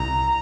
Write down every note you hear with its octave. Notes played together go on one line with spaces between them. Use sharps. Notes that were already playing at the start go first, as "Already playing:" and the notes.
Already playing: C2 A#5